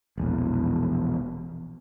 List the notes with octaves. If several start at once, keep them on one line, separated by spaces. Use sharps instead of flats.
E1 A#1 E2